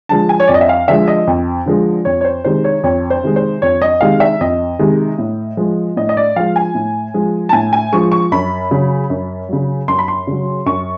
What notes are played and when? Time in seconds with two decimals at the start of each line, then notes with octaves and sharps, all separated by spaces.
0.09 D3 F3 G#3 A5
0.29 G#5
0.40 C#5
0.47 F2 D5
0.54 D#5
0.61 E5
0.69 F5
0.88 D3 F3 G#3 E5
1.08 D#5
1.27 F2
1.66 D3 F3 G#3
2.05 F2 C#5
2.21 C#5
2.24 C5
2.44 C3 D#3 G#3 C5
2.64 C#5
2.83 F2 C#5
3.10 C5
3.23 C3 D#3 G#3
3.36 C5
3.62 F2 C#5
3.82 D#5
4.01 C3 D#3 G#3 F5
4.20 E5
4.41 F2 D#5
4.79 C3 D#3 G#3
5.18 A2
5.57 F3 G#3
5.97 A2 D#5
6.09 D#5
6.17 D5
6.36 F3 G#3 F5
6.56 G#5
6.75 A2
7.14 F3 G#3
7.49 A5
7.53 A2 G#5
7.73 G#5
7.92 F3 G#3 C#6
8.12 C#6
8.32 F#2 B5
8.71 C#3 F#3
9.10 F#2
9.49 C#3 F#3
9.88 F#2 C6
9.99 B5
10.08 C6
10.27 C#3 F#3
10.66 F#2 C#6